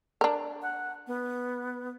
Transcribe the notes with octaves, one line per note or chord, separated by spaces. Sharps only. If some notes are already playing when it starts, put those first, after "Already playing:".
D4 A#4
F#5
B3